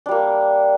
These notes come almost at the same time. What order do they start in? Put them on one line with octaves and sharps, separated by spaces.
D4 G3 A#3